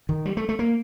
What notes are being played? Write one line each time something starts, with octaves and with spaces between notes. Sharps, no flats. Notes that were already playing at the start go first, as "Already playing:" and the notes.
D#3
G3
A3
A3
A#3